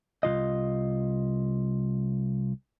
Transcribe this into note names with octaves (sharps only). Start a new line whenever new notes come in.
C2 D#3 F4 D#5